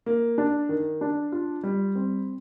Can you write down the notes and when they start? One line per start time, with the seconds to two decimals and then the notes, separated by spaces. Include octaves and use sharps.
0.06 A#3
0.38 D4
0.69 D#3
1.01 D4
1.32 F4
1.63 G3
1.95 C4